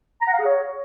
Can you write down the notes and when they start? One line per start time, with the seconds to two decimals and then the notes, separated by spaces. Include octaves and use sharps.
0.21 A#5
0.27 F#5
0.33 F5
0.39 G#4
0.45 C#5